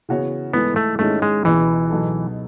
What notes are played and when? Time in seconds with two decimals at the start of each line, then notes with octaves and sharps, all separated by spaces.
0.09 C#3 E3 B3 F#4 C#5
0.53 G#2 E3 A3 B3
0.76 A3
0.99 G#2 D#3 G#3 A3 C#4 E4
1.22 G#3
1.44 C#2 B2 E3 G#3
1.90 B2 F#3 B3 D#4 A4